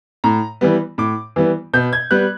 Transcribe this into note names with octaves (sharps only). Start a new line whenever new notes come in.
A2 A#5
E3 G3 B3
A2 D6
E3 G3 B3
B2 G6
G#6
G3 B3 F#6